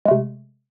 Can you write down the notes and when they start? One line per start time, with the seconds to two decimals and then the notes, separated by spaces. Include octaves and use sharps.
0.05 G#3
0.08 A3
0.11 C3